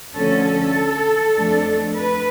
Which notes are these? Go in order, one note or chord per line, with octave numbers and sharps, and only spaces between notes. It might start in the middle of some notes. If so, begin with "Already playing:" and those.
D2 D3 F3 A3 C#4 A4
A4
F2 F3 A3 D4
B4